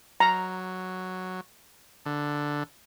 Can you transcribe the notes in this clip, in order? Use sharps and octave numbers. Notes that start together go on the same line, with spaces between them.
F#3 A#5
D3